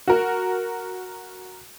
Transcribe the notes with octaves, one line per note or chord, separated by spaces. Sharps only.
F#4 A#4